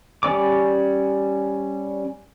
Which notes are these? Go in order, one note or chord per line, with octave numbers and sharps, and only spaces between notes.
G3 C#4 D5 D6